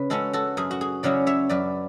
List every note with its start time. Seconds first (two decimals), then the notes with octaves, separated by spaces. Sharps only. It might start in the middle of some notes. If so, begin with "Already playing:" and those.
Already playing: C#3 B4
0.10 G#3 C#4 F#4 A4
0.33 F#4 A4
0.57 F#2 G#4
0.71 F#4
0.81 G#4
1.03 C#3 F#3 C#4 E4 D5 F#5
1.26 C#5 E5
1.49 F#2 B4 D5